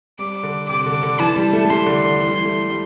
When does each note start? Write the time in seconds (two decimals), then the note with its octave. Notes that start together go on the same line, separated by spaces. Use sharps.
0.19 G3 D6
0.43 D3
0.69 C3 D6
0.86 D3
1.03 D3
1.19 E3 A5
1.36 G3
1.53 A3
1.65 A3
1.70 G3 C6
1.86 D3
2.04 D3
2.20 E3
2.27 G3
2.34 E3
2.45 A3
2.70 G3